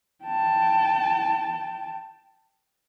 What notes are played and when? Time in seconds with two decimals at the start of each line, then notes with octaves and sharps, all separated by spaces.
0.24 G5 A5